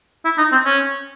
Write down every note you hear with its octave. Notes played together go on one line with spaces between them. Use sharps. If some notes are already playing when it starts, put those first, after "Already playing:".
E4
D#4
C4
C#4